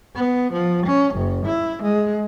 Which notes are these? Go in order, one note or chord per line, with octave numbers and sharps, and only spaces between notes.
B3
F3
C#4
F#1
E4
G#3